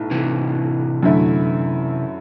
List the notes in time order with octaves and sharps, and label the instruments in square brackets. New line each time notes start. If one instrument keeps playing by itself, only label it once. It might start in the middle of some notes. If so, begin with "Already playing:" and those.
Already playing: [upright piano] B1 A2
[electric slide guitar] C3 E3
[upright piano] F#2 D3 A3 E4